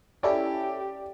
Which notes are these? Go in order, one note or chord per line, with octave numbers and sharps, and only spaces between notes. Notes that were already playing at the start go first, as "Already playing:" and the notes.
C#4 E4 G4 A4 D5